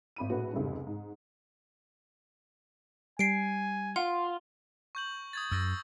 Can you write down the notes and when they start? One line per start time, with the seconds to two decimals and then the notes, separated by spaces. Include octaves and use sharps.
0.16 G#1 B5 D#7
0.29 A#1 A2 F#4 B4
0.53 F1 C#2 G#2 G3
0.87 G#2
3.19 G3 G#5 C7 D7
3.96 F4 F#5 C6
4.95 C#6 G6 F#7
5.33 D#6 G#6 A6
5.52 F#2 E6 A6 A#6